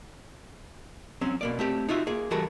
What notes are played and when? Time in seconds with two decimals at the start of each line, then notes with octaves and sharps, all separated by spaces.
1.21 F#3 C4 C#4
1.41 B2 A#3 D5
1.59 A3 C4 G4
1.89 D#4 F4 F#4 E5
2.07 A#3 G#4
2.31 E3 G3 F#4 A4 A#4